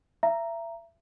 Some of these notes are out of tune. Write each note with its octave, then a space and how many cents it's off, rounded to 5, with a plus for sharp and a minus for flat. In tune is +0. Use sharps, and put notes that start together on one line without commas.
E5 +30 A#5 +0